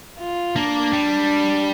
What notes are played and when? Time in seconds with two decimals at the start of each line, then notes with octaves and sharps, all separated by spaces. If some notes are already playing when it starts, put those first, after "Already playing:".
0.19 F4
0.56 A#3 D4
0.93 G3